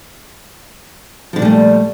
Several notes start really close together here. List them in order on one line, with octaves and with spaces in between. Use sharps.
F3 D3 A#2 G3 A3